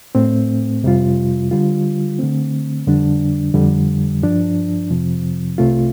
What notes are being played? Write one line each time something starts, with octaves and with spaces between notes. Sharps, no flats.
A2 A3 C4
F2 C3 G3 F4
D3 G3 F4
D3 A3 C4
F2 D3 G3 D4
F2 D3 G3
G2 F3 D4
F2 C3 F3 C4
C2 C3 A3 F4